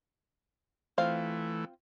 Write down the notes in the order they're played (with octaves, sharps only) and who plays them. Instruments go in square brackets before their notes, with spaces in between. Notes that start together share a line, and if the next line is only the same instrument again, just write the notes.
[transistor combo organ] E3 A3 [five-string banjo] C4 F4 F5